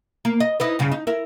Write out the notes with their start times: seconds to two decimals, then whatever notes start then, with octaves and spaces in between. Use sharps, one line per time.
0.25 A#3
0.40 D#5
0.60 D#4 E4 B4
0.79 G2 C#3
0.92 D#4
1.07 E4 A#4